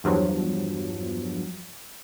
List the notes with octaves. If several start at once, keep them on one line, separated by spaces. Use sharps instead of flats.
E2 G2 F3 F#3